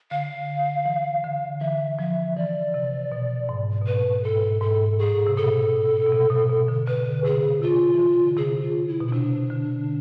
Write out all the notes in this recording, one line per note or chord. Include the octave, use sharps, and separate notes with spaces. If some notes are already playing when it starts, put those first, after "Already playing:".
D3 F5
E3
D3
E3 E5
F3 E5
E3 D5
C3
B2
G#2
B2
A2 B4
G#2 A4
G#2 A4
A2 G#4
C3
B2 A4
B2
C3
B2
B2
D3
D3 B4
C3 G#4
C3 F4
E3
D3
C3 G#4
F4
E4
B2
E4
C3 D4
D3